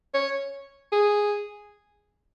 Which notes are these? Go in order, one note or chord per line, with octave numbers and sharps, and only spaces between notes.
C#5
G#4